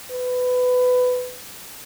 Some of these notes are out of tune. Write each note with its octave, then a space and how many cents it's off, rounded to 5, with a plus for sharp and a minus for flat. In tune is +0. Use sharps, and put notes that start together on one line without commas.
B4 +20